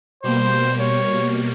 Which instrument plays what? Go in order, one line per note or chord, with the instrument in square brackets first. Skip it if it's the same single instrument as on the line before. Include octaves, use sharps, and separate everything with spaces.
[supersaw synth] B2 G3 A#3 [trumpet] C5
[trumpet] C#5